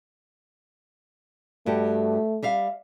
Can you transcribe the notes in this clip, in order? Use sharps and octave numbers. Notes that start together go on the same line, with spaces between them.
G2 A3 F#4 G4
G3 E5 F5